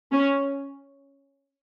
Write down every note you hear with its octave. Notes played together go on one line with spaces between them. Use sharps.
C#4